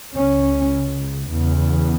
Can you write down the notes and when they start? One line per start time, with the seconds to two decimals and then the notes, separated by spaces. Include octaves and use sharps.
0.15 C#2 C#3 C#4
1.30 E2 C#3